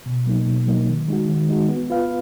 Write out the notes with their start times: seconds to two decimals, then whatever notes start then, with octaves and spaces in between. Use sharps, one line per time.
0.06 B2
0.26 F#3 A#3 D#4
0.46 B2
0.67 F#3 A#3 D#4
0.88 D#3
1.08 G#3 D#4 F#4
1.29 D#3
1.49 G#3 D#4 F#4
1.69 B3
1.90 F4 B4 F5